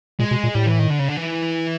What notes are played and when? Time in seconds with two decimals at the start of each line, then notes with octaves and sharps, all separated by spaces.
0.19 A#2 G#3
0.31 B2
0.43 A#2
0.55 A2 G3
0.67 E3
0.79 D#3
0.90 D3
0.99 C#3
1.09 D3
1.17 E3